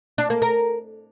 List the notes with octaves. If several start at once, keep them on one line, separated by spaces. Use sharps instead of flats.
D4
A#3
A#4